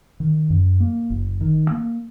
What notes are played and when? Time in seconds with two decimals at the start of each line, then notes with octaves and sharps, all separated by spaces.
0.20 D#3
0.50 F#2
0.80 A#3
1.10 F#1
1.41 D#3
1.71 A#3